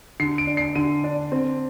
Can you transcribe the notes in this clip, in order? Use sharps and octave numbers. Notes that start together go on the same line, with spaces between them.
D3 C7
D7
D4
C7
D3 D#7
D4
C4